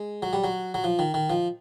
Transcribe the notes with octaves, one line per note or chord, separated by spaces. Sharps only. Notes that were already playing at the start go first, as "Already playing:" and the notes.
Already playing: G#3
F#3
G3
F#3
F#3
F3
D#3
D#3
F3